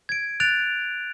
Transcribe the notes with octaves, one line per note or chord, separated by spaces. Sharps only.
G#6 D7
F#6 A6 D7 F7